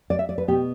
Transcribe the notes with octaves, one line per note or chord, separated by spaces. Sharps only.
D5
E5
D5
B4
B2 B3 G4